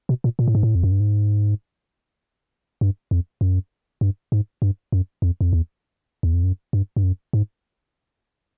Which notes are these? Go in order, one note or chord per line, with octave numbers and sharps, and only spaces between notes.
B2
A#2
A#2
A2
G#2
A2
F2
F#2
G2
G#2
G2
F2
F#2
G2
G#2
G2
F#2
F2
F2
E2
E2
F2
F#2
G2
G2
F#2
G#2